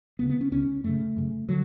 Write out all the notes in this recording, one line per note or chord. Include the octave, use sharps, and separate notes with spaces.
D2 C#3 B3
B3
C#4
C#2 C#3 C#4
F#2 C#3 A3
F#2 C#3
D3 F#3